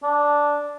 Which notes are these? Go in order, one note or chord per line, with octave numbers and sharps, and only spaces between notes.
D4